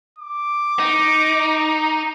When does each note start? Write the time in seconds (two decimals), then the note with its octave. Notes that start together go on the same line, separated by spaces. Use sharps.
0.19 D6
0.80 D#4